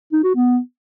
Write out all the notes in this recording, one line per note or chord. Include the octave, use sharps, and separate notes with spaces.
D#4
F#4
B3